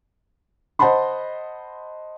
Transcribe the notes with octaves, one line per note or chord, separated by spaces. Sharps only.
C5 D#5 F#5 A5 B5 C6